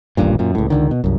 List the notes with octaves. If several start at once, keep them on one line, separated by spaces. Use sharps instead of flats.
D#1 A1 G2 A#2
F#2 A#2
C#2 A2
C#2 D3 D#3
B2
C2 F#2